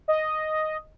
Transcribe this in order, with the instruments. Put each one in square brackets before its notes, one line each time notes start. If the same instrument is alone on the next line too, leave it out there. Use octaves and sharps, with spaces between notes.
[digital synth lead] D#5